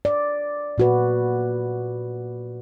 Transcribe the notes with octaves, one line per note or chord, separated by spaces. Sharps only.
D5
A#2 F#4 B4